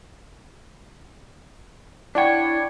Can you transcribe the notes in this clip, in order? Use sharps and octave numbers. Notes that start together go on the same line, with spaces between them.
D4 E4 C#5 D5 F#5 G5